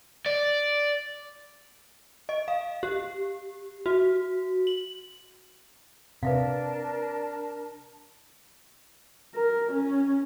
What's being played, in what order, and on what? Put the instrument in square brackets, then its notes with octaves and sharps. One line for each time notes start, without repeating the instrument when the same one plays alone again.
[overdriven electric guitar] D5
[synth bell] D#5
F5
G4
F#4
F#7
[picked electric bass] C3 [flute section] D4 A#4 A5 [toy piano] B4 E5 F5
[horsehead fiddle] A#4
C#4